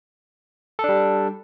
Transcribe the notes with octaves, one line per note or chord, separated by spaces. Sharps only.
G3 D4 A4